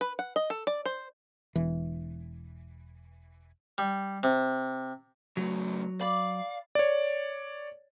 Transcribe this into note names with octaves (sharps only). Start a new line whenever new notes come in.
B4
F#5
D#5
A4
D5
C5
E1 E3
G3
C3
C#3 F#3 A3
D5 F5 B5
C#5 D5